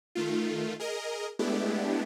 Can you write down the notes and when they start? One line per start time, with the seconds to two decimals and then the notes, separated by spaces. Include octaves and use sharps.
0.15 D#3 A3 F4
0.80 G#4 A#4 D#5
1.39 G#3 A3 B3 D4 E4 G4